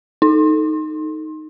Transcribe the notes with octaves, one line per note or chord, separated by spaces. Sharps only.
D#4